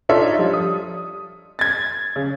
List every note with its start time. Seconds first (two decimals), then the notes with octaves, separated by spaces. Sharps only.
0.09 D4 D#4 F4 A4 C#5 E5
0.38 F3 G3
0.53 D#6
1.59 G#6 A6
2.16 C#3